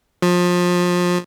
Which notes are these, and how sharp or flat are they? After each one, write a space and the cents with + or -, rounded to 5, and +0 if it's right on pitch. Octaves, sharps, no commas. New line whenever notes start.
F3 +25